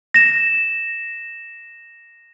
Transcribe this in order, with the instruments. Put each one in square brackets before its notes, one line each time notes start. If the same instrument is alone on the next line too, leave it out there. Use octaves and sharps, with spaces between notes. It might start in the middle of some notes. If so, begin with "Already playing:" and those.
[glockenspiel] A#6 E7